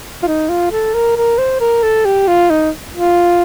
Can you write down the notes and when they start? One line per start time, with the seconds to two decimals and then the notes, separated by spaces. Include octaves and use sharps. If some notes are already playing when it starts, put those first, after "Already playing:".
0.23 F4
0.27 D#4
0.49 F4
0.72 A4
0.94 A#4
1.17 A#4
1.38 C5
1.60 A#4
1.83 A4
2.05 G4
2.27 F4
2.50 D#4
2.95 F4